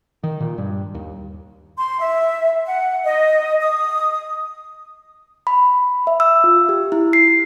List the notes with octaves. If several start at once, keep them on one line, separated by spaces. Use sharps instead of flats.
D#3
A#2
G2
D#2
C6
E5
F#5
D#5
D#6
B5
E5
E6
F4
G4
E4
C7